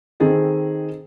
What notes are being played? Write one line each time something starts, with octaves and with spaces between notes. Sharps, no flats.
D#3 C4 G#4 A4 D#5